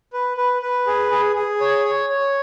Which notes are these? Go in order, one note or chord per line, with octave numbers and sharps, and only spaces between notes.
B4
B4
B4
G#4
G#4
G#4
C#5
C#5
C#5